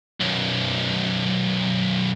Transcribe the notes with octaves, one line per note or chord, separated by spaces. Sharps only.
B1 F#2